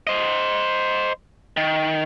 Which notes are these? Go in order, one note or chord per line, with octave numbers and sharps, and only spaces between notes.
C5 D#5
D#3